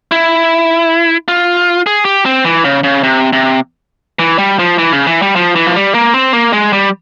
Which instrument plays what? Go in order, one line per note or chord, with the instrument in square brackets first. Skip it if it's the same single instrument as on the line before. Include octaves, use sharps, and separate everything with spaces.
[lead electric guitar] E4
F4
G#4
G4
C4
E3
C#3
C#3
C3
C3
E3
G3
F3
E3
C#3
E3
G3
F3
E3
F3
G3
A#3
C4
A#3
G#3
G3